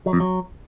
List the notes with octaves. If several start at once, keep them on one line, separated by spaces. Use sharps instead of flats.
F#3
F2
F#3